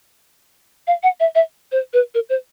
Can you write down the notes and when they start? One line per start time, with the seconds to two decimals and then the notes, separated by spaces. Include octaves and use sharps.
0.87 F5
1.03 F#5
1.20 E5
1.35 E5
1.72 C5
1.93 B4
2.14 A#4
2.29 C5